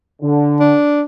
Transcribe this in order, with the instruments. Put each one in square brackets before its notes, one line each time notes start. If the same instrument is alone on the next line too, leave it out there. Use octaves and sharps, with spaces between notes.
[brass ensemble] D3
[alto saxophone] D4